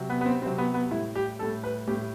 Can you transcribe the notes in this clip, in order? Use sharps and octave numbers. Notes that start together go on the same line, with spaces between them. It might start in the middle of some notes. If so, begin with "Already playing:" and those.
Already playing: C3 F#3
B3
B3
C4
C3 F#3 C4
B3
B3
A2 G3 E4
G4
A2 G3 A4
B4
A2 G3 G4